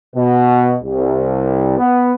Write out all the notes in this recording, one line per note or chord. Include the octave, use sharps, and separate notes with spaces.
B2
C2
B3